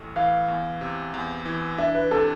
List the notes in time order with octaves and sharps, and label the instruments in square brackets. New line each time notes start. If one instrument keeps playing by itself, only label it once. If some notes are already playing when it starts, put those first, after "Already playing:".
Already playing: [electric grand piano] A1 A2 A3
[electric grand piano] E3 [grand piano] F5
[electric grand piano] E2
C3
E2
E3
[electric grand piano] D4 [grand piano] E5
[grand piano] B4
[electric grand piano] C3 [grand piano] A4